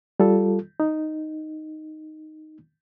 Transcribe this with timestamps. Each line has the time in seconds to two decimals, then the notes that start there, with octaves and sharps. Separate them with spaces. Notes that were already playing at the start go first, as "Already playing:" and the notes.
0.20 G3 F4 A4
0.80 D#4